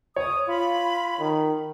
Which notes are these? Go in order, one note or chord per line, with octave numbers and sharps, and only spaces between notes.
C#5 D#6
F4 B5
D#3